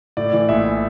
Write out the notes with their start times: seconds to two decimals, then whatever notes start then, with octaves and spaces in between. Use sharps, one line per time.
0.17 A2 D5
0.33 E3
0.49 A#1 E5